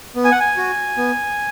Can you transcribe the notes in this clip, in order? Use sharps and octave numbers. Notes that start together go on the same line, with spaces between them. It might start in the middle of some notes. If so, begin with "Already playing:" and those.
B3
G#5
F#5
G#5
F#4
B3